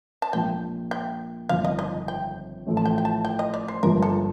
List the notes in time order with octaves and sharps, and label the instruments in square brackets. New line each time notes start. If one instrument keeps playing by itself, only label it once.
[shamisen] A5
[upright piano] A#1 A#2 F3 A#3 [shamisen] G5
[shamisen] G5
[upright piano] G1 F2 D#3 [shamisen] F5
[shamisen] D#5
D#5
G5
[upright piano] A1 A2 F3 A3
[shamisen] A5
G5
G5
A5
G5
D#5
D5
C5
[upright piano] G1 G2 F3 A#3 F4 [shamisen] A#4
[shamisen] A4